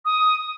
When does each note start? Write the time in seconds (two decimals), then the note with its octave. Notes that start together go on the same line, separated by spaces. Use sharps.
0.05 D#6